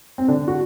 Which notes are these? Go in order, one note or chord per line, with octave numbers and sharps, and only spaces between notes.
C4
D3 D4
F#4